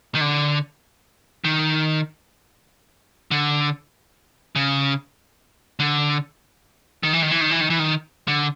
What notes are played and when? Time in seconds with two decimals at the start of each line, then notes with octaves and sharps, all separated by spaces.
0.15 D#3
0.21 D3
1.44 D#3
3.31 D3
4.56 C#3
5.79 D3
7.03 D#3
7.13 E3
7.22 D#3
7.31 E3
7.41 D#3
7.51 E3
7.61 D#3
7.70 E3
7.79 D#3
8.28 D3